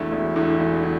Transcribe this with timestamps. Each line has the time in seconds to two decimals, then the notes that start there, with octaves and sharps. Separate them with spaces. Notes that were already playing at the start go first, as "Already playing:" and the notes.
Already playing: E1 E2 D3 A3 E4
0.12 E1
0.36 E2 D3 A3 E4
0.60 E1
0.83 E4